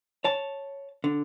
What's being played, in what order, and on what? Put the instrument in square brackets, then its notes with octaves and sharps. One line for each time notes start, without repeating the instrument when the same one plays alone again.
[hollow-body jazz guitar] C#5 A5
D3